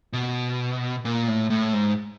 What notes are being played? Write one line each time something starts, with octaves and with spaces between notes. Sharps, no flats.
B2
A#2
A2
A2
G#2